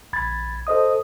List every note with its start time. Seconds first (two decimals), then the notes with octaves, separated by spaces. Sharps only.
0.13 A#1 B5 G#6 A6
0.67 A4 C5 D#5 D#6